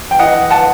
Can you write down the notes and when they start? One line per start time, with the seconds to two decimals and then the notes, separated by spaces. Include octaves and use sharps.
0.11 G5
0.19 E3 D#5 F#5
0.50 F#5 A5